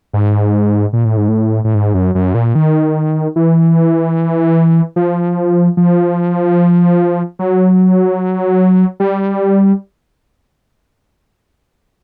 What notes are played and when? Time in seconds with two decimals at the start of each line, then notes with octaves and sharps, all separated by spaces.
0.13 G#2
0.93 A#2
1.05 A2
1.17 G#2
1.28 A2
1.64 A2
1.75 G#2
1.94 F#2
2.15 F#2
2.34 A#2
2.55 D#3
3.36 E3
4.96 F3
5.77 F3
7.39 F#3
9.00 G3